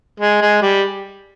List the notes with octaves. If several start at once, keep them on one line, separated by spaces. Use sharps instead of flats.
G#3
G#3
G3